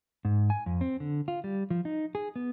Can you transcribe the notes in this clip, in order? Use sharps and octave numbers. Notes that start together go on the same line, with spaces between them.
G#2
G#5
F2
C4
D3
F4
G3
F3
D#4
G#4
B3